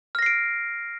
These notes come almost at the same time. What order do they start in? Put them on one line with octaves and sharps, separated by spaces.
F6 A#6 C7 D7